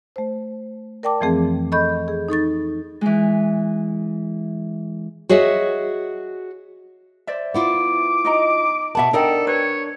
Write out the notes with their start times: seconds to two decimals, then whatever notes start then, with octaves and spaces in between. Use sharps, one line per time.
0.16 A3 C5
1.03 A#4 D5 G5 A5 D6
1.20 F2 E3 F3 A3 C4 G#4
1.72 A4 D#5 B5 C#6 G6
2.08 G#4
2.29 D#4 A4 C#6 A6
3.01 E3 G#3
5.29 F#4 G#4 C#5 D#5 E5
7.27 C5 D5 E5
7.54 B3 E4 F4 D6
8.25 D#4 D#5 A#5
8.95 B2 B3 B4 E5 A5
9.13 D4 D#4 A4 A#4 D5 F#5 G5
9.47 B4 C#5